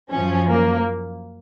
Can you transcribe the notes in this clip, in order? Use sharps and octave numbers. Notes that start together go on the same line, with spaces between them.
F#2 F3 C#4
A#3